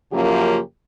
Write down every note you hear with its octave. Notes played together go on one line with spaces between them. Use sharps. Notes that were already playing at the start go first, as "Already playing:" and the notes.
F#2 C#3 F3 A#3 F4 G4